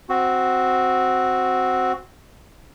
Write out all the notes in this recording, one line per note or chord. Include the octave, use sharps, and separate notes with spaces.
C4 F#4